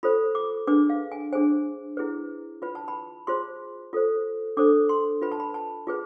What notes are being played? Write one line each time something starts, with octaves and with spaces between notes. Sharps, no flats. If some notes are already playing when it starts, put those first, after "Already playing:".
F4 A4 C5 B5
D6
D4 G#4 B4 D6
F5
G#5
D4 G#4 C5 G#5
E4 G#4 B4
F4 B4 B5
A5
B5
F4 G#4 C5 C6
F4 A4 C5
D4 A4 C5 D6
C6
F4 B4 B5
A5
B5
A5
F4 G#4 B4